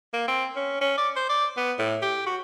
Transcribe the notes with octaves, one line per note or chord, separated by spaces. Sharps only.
A#3
C4
C#4
C#4
D5
C5
D5
B3
A2
G4
F#4